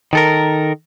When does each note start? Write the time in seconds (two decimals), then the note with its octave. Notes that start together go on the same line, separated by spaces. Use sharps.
0.13 D#3 A4 A#4